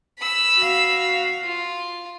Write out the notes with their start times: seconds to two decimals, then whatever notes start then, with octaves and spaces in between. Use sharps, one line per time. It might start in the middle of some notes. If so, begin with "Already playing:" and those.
0.19 B5 E6
0.58 F#4 F5
1.43 F4